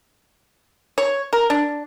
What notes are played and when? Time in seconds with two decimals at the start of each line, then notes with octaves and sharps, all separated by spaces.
0.98 C#5
1.33 A#4
1.50 D4